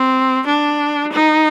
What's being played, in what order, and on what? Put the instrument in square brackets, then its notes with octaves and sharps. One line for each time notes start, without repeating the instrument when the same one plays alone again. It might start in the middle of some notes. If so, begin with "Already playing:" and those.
Already playing: [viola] C4
D4
D#4